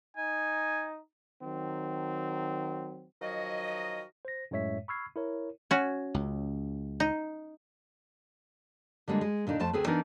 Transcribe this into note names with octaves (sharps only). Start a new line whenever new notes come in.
D#4 G#5
D#3 F#3 C4
D#3 F3 F#3 F#4 A#4 D#5
C5 A#6
F#2 A2 G#3 C#5 E5 B6
B5 C#6 E6 F6 G#6 C7
E4 A#4 C#5
C#4 F#4
C#2
D#4
D3 G3 G#3 A#3 D4
G#3
A#2 D3 D4 D#4
F2 A3 C5 A5
D2 C4 G#4 A4 B4
E3 B3 D4 D#4 A#4